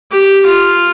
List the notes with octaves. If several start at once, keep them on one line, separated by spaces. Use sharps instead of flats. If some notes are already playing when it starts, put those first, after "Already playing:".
G4
F4